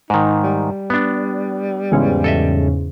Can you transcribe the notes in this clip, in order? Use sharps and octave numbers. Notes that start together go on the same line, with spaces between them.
G#2 D#3 D#4
G3
B3 D4
E2 G#2 C#3
A4 D#5 E5